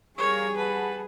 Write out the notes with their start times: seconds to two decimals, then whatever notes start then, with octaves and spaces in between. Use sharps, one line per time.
0.18 G3 G#4 A#4 C#5 F5 C#6
0.57 B4 F#5 A5 B5